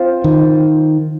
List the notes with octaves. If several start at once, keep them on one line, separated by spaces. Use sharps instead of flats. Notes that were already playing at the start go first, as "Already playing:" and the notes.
Already playing: C4 F4 C5
D#3